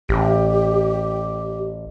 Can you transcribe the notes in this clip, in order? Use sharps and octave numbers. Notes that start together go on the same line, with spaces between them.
A1 G4